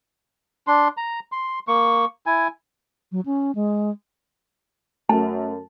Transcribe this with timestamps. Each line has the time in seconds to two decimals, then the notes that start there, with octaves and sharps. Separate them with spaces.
0.67 D4 C6
0.97 A#5
1.32 C6
1.68 A#3 C#6
2.26 E4 G#5
3.12 F#3
3.26 C#4
3.55 G#3
5.09 F#2 A3 A5